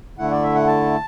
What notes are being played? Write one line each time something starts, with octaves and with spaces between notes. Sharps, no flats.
D3 A3 E4 F#5
D5
E5
F#5
A5